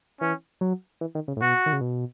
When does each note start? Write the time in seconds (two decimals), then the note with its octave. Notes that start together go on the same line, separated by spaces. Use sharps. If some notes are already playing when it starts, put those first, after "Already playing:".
0.21 E3 C#4
0.61 F#3
1.01 E3
1.15 D#3
1.28 C#3
1.37 A2
1.41 B2 F#4
1.66 D#3
1.73 C#3
1.81 B2